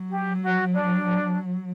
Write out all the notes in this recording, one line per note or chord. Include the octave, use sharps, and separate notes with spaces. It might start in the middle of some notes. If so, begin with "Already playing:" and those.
Already playing: F#3
G4
F#4
D4